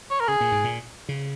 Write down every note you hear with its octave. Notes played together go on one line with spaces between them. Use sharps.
C#5
A#4
C#3 G#4
A#2
G#2
A#2
C#3